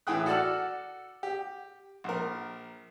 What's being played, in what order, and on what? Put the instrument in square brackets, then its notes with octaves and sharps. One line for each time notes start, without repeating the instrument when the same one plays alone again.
[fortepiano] A2 E3 G#4 G5 D#6 F#6
F#4 A4 D5 F#5 A5 F6
G4
A#1 A#4